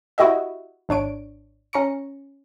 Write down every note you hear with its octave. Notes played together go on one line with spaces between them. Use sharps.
E4 F#4 G4 D#5 E5
G#1 D4 C#5 D7
C#4 A#5 C#6 C#7